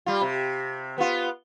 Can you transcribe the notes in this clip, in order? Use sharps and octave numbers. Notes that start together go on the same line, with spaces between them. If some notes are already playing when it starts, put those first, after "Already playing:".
G3 F4
C3
B3 F4